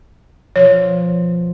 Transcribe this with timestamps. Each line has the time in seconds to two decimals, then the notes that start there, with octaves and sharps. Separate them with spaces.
0.56 B2 F3 C#5